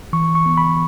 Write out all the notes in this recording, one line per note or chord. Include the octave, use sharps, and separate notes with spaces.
E3 C#6
C#6
B3
B5